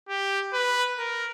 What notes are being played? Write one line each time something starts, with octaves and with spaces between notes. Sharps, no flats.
G4
B4
A#4